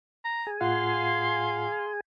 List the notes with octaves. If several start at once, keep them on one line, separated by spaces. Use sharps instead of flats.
A#5
G#4 G#5
A2 F4 F5 F#5 C6